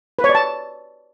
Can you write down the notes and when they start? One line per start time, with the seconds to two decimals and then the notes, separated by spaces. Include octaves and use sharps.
0.19 B4
0.24 C#5
0.29 D5
0.35 A5